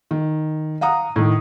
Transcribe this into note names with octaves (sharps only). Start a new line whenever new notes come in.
D#3
F5 F#5 A#5 D#6
A2 D#3